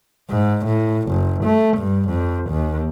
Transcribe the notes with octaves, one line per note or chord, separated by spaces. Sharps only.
G#2
A2
F#1
A3
G2
F2
D#2